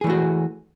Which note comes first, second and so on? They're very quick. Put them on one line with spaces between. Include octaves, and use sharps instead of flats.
G#4 E3 A3 F#4